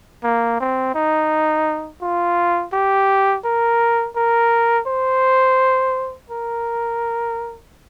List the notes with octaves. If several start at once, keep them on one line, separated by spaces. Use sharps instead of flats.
A#3
C4
D#4
F4
G4
A#4
A#4
C5
A#4